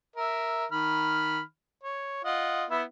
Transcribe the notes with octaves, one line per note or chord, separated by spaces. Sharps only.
A#4 E5
D#3 B5 F6
C#5
F4 D#5 F#5
B3 E4 E5